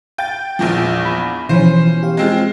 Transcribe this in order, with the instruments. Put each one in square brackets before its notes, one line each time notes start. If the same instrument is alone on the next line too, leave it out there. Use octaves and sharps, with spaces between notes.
[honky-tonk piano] G5 [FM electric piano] G6 A6
[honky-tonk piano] A#1 E2 F3
[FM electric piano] B5
[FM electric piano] B2 E3 F3 [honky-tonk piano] C#4 C5
[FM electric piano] G4 F5
[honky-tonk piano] G#3 C4 F4